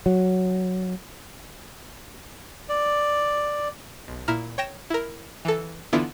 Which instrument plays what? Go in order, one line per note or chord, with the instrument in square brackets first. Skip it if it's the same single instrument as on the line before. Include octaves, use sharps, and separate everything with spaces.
[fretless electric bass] F#3
[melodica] D5
[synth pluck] B1
A#2 E4 A#5 F6
C#5 G5 A#6 E7
E4 A#4
E3 A4
D3 E3 B3 D4 E4 F4